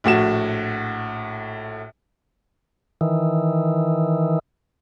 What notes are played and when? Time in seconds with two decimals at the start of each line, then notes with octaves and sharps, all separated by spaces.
0.04 A#1 A2 F#4 E7
3.01 D#3 E3